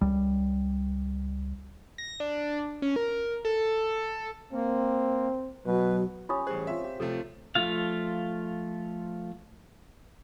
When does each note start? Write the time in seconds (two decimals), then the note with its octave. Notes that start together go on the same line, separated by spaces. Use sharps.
0.01 C#2 G3
1.98 A#6
2.20 D4
2.82 C#4
2.96 A#4
3.45 A4
4.52 A#3 C4
5.66 B2 F#3 B4
6.29 C#4 F4 G4 A#5 D#6
6.47 A1 G3 G#4 C5
6.67 C4 F4 E5
6.84 G4
7.00 C3 F3 A3 A4
7.55 F3 A3 F4 F5